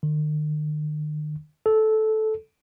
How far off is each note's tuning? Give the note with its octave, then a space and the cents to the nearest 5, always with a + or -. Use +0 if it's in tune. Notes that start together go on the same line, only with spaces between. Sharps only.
D#3 -45
A4 -15